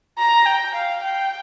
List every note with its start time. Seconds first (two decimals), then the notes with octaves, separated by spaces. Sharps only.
0.18 A#5
0.46 G5
0.74 F5
1.03 G5